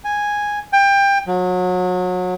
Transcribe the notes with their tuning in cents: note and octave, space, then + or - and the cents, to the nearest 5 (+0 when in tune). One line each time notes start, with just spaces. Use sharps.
G#5 -5
G5 +25
F#3 -30